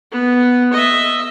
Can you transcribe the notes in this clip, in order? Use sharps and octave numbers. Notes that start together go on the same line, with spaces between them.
B3
D#5 E5